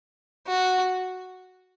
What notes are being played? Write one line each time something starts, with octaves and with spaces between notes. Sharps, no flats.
F#4